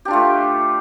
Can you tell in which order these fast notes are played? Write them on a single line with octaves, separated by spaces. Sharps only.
G4 D4 F4 A3